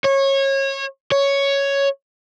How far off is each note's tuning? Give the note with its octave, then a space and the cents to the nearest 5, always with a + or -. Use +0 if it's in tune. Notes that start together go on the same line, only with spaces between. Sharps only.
C#5 -25
C#5 +5